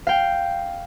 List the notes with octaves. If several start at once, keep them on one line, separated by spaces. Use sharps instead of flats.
F5 G5